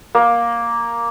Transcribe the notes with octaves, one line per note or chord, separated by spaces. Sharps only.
A#3